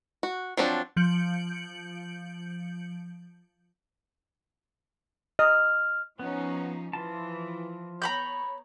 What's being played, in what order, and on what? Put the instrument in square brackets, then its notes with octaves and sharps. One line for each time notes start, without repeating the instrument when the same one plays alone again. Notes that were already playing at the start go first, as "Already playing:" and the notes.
[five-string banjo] F#4
F3 F#3 C4 D4
[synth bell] F3 G6 C#7 D7 F#7
[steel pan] D#5 [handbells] F6
[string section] F3 C#4 D#4 [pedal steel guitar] B3
[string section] E3 [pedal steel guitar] F3 F4 A5
[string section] B3 C#5 [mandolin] A#5 B5 G6